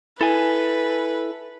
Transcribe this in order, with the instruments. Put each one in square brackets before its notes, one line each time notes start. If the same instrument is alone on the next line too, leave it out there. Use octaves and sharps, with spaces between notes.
[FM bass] E4 [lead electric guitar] A4 G#5 [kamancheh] B4